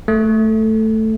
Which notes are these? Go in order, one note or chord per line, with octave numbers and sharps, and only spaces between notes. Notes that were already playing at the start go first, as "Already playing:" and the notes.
A3